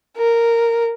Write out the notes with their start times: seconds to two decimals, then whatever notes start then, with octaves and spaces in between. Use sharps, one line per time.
0.17 A#4